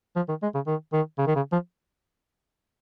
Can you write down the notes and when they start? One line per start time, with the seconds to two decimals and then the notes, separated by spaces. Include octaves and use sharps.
0.16 F3
0.29 D#3
0.42 G#3
0.55 C#3
0.67 D#3
0.93 D#3
1.18 C#3
1.27 D#3
1.36 C#3
1.52 F3